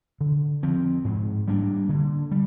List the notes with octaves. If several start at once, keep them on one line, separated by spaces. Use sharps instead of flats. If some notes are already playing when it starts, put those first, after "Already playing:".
D3
F3 C4
G#2
G3 A#3 D4
D3
G3